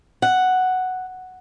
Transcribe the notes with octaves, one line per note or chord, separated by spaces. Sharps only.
F#5